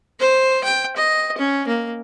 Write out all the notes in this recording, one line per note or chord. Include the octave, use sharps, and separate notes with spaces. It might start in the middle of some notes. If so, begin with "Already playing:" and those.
C5
G5
D#5
C#4
A#3